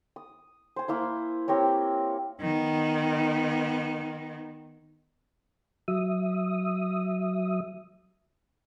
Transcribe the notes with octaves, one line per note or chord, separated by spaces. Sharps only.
D#6
C5 G#5
A#3 E4 C5
C4 G4 A#4 C#5
D#3 B3
F#3 E5 D#6